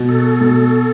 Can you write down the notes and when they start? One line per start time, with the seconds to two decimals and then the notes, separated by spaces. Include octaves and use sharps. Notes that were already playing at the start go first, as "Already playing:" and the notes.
Already playing: B2
0.09 A4
0.41 B2